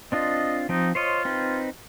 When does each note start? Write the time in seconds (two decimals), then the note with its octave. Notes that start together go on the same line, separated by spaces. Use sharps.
0.12 C4 D4 F4 D#5
0.69 F3 C4 D#4
0.95 F4 C5 C#5 D#5
1.25 C4 D#4 B4